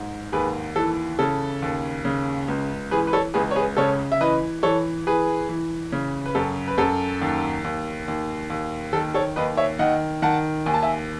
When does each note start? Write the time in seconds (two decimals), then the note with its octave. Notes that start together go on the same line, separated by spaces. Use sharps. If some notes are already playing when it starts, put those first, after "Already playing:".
Already playing: G#2
0.32 D#2 G#4 B4
0.76 E3 A4
1.19 C#3 A4
1.62 D#2
2.05 C#3
2.48 C#2
2.91 E3 G#4 B4
3.07 B4
3.13 A4 C#5
3.34 C#2 G#4 B4
3.51 C#5
3.56 G#4 B4
3.77 C#3 A4 C#5
4.12 E5
4.21 E3 B4 D#5
4.63 E3 A4 C#5
5.07 E3 G#4 B4
5.49 E3
5.92 C#3
6.26 B4
6.35 F#2 A4
6.68 B4
6.78 F#2 A4
7.21 D#2
7.64 D#2
8.08 D#2
8.50 D#2
8.93 D#3 A4
9.14 A4 C#5
9.36 D#2 B4 D#5
9.57 C#5 E5
9.79 D#3 D#5 F#5
10.22 D#3 F#5 A5
10.66 D#2 G#5
10.74 A5
10.83 E5 G#5